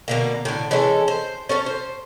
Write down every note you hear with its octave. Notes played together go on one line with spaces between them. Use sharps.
B2 D3 A#3
A2 D3
E3 G#3 C#4 A4
C5
C#4 A4 C5 C#5
C5